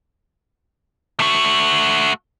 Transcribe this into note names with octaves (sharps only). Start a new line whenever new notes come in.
A3 F#4